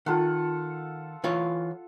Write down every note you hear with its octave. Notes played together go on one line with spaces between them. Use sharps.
D#3 F4 A4 F#5
E3 F4 C#5